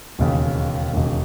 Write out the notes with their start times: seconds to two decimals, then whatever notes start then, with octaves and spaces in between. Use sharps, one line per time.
0.19 E1 D#2 C#3
0.92 E1 D#2 C#3